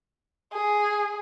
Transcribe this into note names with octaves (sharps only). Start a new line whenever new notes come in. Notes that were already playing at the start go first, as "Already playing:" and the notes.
G#4